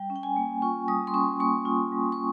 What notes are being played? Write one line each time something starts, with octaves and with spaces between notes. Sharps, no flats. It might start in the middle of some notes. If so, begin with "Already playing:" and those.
Already playing: G3 G5
C#4
G5
G#5
A#3
F4 C#6
G3 D#6
C6
C#4 C#6
A#3 C#6
F4
G3
C#6